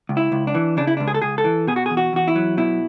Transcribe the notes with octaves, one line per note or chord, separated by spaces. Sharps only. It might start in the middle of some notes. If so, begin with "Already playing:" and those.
C#2
E4
C#2
D4
E3
C#3 D4
E4
C#2 D4
G#4
A4
C#2 G#4
A4
E3
B2 G#4
F#4
E2 G#4
F#4
E2 F#4
E4
F#3
B2 E4